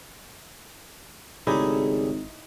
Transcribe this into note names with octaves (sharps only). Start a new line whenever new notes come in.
G#1 C#3 A3 D#4 E4 G4 G#4 D5